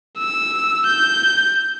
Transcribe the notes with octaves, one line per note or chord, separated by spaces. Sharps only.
E6
G6